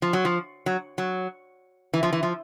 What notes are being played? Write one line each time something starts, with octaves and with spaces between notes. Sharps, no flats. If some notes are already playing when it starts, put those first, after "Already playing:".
F3
F#3
F3
F#3
F#3
E3
F3
E3
F3